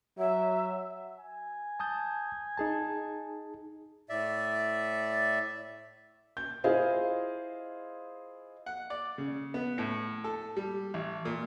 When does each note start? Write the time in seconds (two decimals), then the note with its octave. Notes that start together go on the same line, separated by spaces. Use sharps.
0.18 F#3 E5
1.20 G#5
1.80 A5 D#6 G6
2.57 D#4 G#4 A5
4.09 A2 D5 E5
6.37 G6
6.64 E4 F4 G#4 C5 D#5 F5
8.66 F#5
8.90 D5
9.18 C#3
9.54 B3
9.78 A2
10.24 A4
10.57 G3
10.94 A1
11.25 A#2